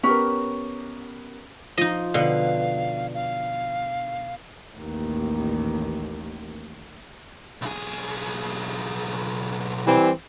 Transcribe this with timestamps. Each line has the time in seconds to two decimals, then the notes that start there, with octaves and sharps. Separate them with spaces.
0.03 B3 C#4 G4 A#4
1.78 F3 D#4 D#5
2.14 B2 D3 B4 F5
3.14 F5
4.74 A1 D#2
7.62 B1 G#4
9.85 E3 G3 C4